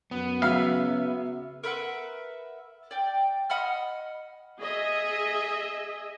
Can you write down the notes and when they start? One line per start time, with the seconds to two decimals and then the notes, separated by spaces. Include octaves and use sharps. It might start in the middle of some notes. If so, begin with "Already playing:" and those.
0.11 F#2 B3
0.42 C#3 F#3 E5 F5 B6
1.64 A#4 B4 E5 F#5
2.91 D5 G5
3.50 D#5 F#5 B5 F6
4.60 G#4 D#5 E5